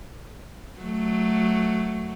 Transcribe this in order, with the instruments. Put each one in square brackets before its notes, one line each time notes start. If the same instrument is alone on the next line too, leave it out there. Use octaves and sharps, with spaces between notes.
[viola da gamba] F#3 A3